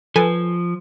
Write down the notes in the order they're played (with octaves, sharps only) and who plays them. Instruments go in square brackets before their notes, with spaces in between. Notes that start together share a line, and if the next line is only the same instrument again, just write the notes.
[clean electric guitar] F3 [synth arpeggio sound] A4 B4 G#5